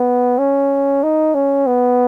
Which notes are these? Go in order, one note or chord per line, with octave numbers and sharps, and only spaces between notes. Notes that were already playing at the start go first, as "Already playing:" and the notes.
Already playing: B3
C#4
D#4
C#4
B3